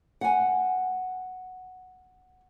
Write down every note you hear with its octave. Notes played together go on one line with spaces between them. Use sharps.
F#5 G#5